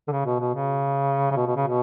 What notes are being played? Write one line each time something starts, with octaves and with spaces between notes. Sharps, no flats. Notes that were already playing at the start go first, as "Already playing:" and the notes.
D3
C#3
B2
B2
C#3
C#3
B2
B2
C#3
B2